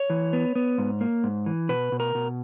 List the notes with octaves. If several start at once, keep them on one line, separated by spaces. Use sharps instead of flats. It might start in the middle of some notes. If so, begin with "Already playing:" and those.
Already playing: C#5
E3
B3
B3
G#2
A#3
G#2
E3
B2 B4
B2
A#4
B2